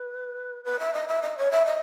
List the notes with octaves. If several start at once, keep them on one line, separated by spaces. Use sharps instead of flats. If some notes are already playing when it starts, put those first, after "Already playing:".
Already playing: B4
B4
E5
D#5
E5
D#5
C#5
E5
D#5